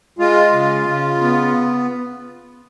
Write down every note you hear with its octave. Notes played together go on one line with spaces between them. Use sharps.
G#3 F4
C#3
C#3
B3